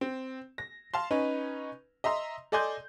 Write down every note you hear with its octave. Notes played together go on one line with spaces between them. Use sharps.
C4
A#6
F5 A5 C6
C#4 D#4 B4
D#5 E5 A#5 C6
A4 D5 D#5 G#5 C6 G6